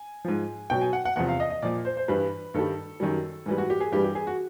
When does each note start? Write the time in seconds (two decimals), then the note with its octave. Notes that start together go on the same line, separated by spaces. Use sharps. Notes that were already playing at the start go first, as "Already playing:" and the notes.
Already playing: G#5
0.25 G#2 F3
0.70 B2 F#3 G5
0.81 G#5
0.93 F#5
1.05 F#5
1.16 E2 C3 F3 F#5
1.28 F5
1.40 D#5
1.50 D#5
1.62 A#2 F3 D5
1.85 C5
1.97 C5
2.08 G2 E3 G3 B4
2.54 G2 D#3 G3 A4
3.00 F#2 D#3 G3
3.46 G#2 E3 G3
3.58 F#4
3.70 G4
3.80 G#4
3.92 G2 E3 G3 G4
4.04 G4
4.15 G#4
4.27 F#4